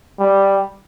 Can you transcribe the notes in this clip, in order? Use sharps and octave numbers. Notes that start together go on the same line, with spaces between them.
G3